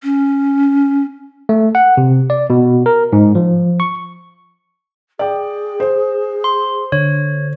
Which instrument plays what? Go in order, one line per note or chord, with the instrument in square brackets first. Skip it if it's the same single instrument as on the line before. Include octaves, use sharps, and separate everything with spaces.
[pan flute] C#4
[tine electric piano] A3
F#5
C3
D5
B2
A#4
G#2
F3
C#6
[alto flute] G#4 [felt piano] D5 G5
[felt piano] C5
[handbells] C6
[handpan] D3 [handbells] C#5